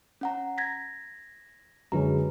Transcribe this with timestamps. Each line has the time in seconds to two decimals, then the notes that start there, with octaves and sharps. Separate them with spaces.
0.21 C#4 F#5 A#5
0.58 G#6 A#6 B6
1.92 F#2 D3 G#3 B4 A#5